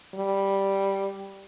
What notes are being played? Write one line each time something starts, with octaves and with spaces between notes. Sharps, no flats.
G3